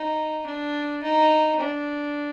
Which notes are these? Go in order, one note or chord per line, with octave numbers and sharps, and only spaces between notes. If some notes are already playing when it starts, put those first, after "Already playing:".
Already playing: D#4
D4
D#4
D4